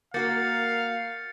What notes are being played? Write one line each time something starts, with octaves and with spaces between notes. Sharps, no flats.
A#3 F#4 A#4 F5 G6 A6 C#7